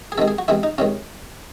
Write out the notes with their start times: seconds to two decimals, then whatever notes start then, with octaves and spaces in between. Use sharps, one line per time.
0.12 G#4
0.18 C3 D#3 G#3 A4
0.28 G#4
0.38 F#4
0.48 E2 C3 E3 G#3 E4
0.63 D#4
0.78 C3 D#3 G#3 C#4